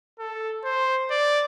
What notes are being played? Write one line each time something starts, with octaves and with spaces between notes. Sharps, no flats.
A4
C5
D5